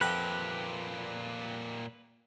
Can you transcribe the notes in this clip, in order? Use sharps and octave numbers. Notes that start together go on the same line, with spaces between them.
F2 A#2 G4 B4 F#5